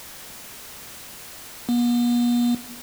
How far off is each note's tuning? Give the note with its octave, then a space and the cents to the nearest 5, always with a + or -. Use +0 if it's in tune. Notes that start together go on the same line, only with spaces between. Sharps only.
B3 -45